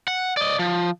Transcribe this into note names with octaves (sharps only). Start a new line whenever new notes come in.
F#5
D5 D#5
F3